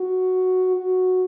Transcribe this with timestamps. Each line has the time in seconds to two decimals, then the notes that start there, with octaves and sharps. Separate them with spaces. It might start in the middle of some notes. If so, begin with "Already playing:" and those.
Already playing: F#4
0.76 F#4